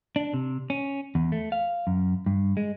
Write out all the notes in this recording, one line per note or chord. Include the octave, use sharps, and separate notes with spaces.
D4
C3
C#4
E2
A3
F5
F#2
G2
G#3